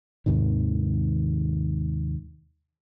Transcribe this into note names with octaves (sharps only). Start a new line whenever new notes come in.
D#2 G#2 C3 D#3